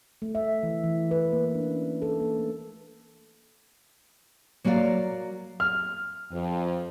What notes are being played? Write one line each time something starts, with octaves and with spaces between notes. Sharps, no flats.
A3
E5
E3
E3
B4
A#3
D4
C#4
A4
A#3
A3
F#3 A#3 F#4 D5 F5
F6
F2